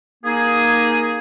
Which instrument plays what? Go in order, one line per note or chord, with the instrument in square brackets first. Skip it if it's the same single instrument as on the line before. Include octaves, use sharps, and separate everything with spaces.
[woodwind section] A#3 D#4 G#4